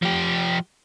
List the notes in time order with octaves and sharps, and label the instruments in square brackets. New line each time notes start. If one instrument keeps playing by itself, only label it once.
[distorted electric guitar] F3 G4